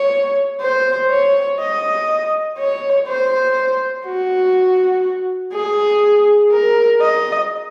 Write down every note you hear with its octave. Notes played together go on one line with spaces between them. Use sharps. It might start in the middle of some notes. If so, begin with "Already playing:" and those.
Already playing: C#5
C5
C#5
D#5
C#5
C5
F#4
G#4
A#4
D#5